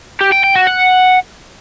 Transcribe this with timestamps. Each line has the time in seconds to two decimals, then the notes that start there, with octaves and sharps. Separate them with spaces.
0.21 G4
0.32 G5
0.44 G5
0.55 F#4
0.67 F#5